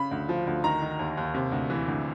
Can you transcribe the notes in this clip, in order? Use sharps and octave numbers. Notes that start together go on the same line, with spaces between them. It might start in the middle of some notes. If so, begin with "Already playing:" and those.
Already playing: C#3 B5
D2
F3
D2
D#3 A#5
D#3
D#2
D#2
C3
D2
E3
D2